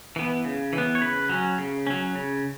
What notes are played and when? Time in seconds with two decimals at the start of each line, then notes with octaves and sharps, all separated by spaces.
0.16 E3 B3
0.44 C#3
0.73 E3
0.78 B3
0.95 C#5
1.01 C#3 B4
1.29 F#3 C#4
1.58 C#3
1.87 F#3 C#4
2.15 C#3